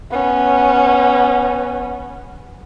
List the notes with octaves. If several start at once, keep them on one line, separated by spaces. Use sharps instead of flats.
B3 C#4